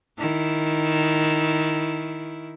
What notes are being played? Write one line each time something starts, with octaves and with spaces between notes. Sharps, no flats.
D#3 E4